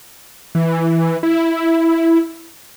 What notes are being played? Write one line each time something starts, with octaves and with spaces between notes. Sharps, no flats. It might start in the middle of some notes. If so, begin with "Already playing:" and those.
E3
E4